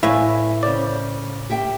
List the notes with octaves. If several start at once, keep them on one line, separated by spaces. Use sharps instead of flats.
A2 E4 B4 D5 E5 F5 G#5
C#3 C5 D5
G4 E5 G5